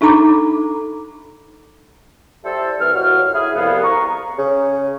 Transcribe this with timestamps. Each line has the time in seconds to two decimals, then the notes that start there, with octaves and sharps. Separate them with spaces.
0.01 D4 D#4 A4 A#5 B5 D6
2.44 G3 E4 A4 C5
2.80 C2 E3 F6
2.94 D#2 A2 F#4 C#5 F5 F6
3.34 E4 G#4
3.54 C2 F2 B3 F5
3.83 A#5 C#6
4.38 C#3